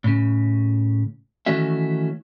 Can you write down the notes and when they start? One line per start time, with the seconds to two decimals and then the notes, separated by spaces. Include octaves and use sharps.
0.04 A2 C#3
1.46 D#3 E3 A3 C#4 F#4 E5